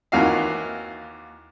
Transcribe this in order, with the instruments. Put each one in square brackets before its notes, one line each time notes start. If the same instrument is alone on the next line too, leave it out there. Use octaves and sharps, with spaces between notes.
[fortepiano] D#2 E3 F4 F#4 F5